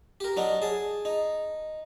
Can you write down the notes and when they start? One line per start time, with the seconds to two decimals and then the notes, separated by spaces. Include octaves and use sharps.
0.20 G4 A#4
0.37 F#3 D4 D#4
0.62 G#4 A5
1.05 D#4